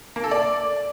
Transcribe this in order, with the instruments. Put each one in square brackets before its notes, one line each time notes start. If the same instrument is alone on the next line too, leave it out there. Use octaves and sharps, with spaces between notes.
[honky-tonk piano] A#3
A4
D5